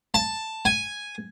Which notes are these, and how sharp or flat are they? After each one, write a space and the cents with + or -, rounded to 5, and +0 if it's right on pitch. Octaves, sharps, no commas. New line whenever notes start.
A5 +5
G#5 -5